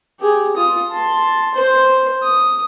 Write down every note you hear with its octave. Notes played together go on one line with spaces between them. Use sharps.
G4 G#4
F4 D#6
A5 C6
C5
D#6